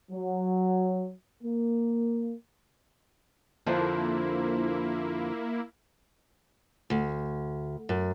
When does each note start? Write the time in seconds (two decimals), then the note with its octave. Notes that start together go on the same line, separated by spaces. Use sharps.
0.12 F#3
1.43 A#3
3.66 F2 D3 F3 A#3 E4
6.90 D2
7.89 F#2